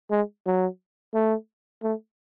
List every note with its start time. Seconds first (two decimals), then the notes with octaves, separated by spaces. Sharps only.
0.11 G#3
0.46 F#3
1.14 A3
1.83 A3